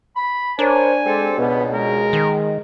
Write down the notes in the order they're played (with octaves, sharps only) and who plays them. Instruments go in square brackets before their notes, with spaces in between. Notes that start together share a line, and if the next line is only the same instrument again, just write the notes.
[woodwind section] B5
[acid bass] D4 [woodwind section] A#4 C#5 [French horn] C5 [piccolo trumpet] G#5
[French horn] G#3 [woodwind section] C4 G4 A4
[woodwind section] C#2 B2 [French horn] B3
[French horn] G#3 [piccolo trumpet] A#4
[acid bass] D#3